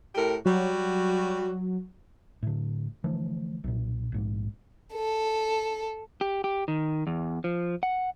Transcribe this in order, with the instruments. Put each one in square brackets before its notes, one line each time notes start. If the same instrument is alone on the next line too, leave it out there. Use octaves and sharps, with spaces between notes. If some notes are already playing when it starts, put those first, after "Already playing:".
[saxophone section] A2 G4 A#4
[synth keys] F#3 [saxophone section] G3 F#4
[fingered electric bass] A2 D3
D3 E3 F3 A3
B1 A#2
A#1 G#2
[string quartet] A4
[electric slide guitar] G4
G4
D#3
E2
F3
F#5